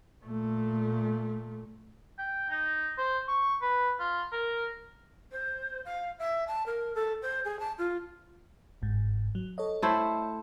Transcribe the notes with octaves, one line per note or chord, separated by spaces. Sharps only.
A#2 A3
G5
D#4
C5
C#6
B4
F4
A#4
C5
F5
E5
A5
A#4
A4
C5
G#4
A5
F4
G1 G#2
F#3
A4 C#5 D#5
A3 E4 C5